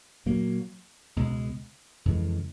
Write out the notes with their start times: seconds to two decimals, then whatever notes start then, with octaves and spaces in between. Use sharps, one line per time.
0.26 A#2 F#3 A#3
1.16 C#2 B2 G#3
2.05 F2 C#3 E3 G#3